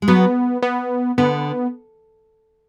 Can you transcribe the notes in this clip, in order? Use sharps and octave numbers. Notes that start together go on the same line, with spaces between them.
G#3
F#3 B3
B3
D3 B3